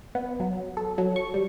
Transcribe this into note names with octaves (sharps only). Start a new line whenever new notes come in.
B3
F#3
A4
F#3
C#6
G3